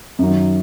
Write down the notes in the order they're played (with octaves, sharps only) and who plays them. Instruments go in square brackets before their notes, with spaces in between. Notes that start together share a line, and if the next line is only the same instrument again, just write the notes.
[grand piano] F#2 D#3 F#3